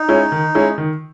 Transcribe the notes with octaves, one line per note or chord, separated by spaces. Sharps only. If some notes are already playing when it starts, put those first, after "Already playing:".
Already playing: D#4
G#3 C#4 E4
D#3
G#3 C#4 E4
D#3